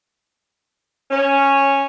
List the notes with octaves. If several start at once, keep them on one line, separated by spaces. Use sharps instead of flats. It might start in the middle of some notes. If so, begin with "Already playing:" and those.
C#4